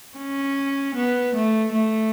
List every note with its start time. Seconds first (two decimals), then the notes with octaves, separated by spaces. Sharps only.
0.17 C#4
0.95 B3
1.35 A3
1.72 A3